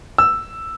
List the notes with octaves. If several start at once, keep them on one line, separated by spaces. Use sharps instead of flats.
E6